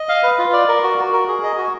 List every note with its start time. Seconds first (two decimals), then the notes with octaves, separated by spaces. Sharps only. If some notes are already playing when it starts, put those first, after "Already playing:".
Already playing: D#5
0.09 F5
0.23 B4
0.39 F4
0.53 D5
0.68 A#4
0.83 F#4
0.98 F#4
1.13 A#4
1.28 G#4
1.43 D#5
1.58 F#4